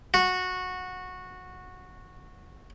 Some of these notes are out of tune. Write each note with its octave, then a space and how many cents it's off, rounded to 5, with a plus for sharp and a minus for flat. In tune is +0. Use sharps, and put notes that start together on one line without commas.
F#4 -15